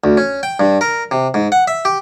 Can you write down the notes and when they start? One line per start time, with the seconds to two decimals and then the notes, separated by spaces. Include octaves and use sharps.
0.04 D2
0.17 C#4
0.43 G5
0.60 G2
0.81 A#4
1.11 C3
1.34 G#2
1.52 F#5
1.68 E5
1.85 G4